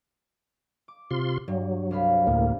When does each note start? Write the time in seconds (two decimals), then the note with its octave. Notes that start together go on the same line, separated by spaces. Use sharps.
0.88 D6
1.11 C3 F4 C6
1.48 G2 F#3
1.91 C2 F5 B5
2.27 D2 A2 G#3 A#3